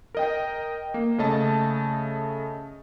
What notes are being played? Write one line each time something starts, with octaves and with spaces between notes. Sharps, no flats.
A#4 D#5 G5
A#3
C#3 A3 D#5 A5